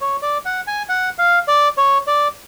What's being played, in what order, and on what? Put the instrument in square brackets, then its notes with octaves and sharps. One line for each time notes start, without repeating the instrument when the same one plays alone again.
[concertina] C#5
D5
F#5
G#5
F#5
F5
D5
C#5
D5